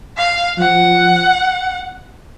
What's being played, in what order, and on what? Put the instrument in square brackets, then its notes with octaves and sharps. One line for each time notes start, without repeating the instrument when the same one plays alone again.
[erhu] F5
[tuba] F3 [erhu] F#5